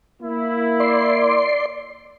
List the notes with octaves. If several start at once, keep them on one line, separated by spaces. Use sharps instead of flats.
A#3 E4
D5 C6